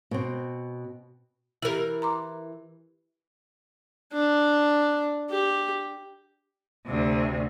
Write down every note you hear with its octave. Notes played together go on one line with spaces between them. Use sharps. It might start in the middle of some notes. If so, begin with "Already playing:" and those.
B2 C4
E3 E4 G4 A#4
A#5 C6 D6
D4
G4
D2 C3